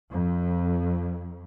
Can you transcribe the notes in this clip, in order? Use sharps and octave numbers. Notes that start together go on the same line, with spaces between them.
F2